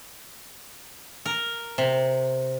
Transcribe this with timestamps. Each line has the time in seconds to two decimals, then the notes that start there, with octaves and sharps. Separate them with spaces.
1.26 A#4
1.78 C3